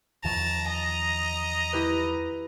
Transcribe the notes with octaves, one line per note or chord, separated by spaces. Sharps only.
E2 D#3 F3 A5 A#5
D#5
E4 G4 B4